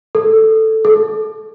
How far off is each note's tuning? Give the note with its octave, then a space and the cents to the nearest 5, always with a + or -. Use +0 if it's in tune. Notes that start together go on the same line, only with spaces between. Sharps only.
A4 +5
A4 -25